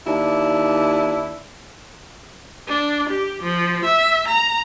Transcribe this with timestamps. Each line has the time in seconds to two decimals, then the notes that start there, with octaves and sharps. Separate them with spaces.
0.07 D#2 D4 E4
2.67 D4
3.09 G4
3.43 F3
3.85 E5
4.28 A#5